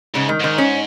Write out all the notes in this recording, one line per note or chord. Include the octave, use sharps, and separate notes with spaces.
G#2 C#3
D#3
G#2 D#3
C#4